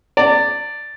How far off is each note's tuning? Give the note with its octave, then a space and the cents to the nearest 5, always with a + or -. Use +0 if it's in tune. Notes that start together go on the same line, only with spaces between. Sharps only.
D5 +0 A#5 -45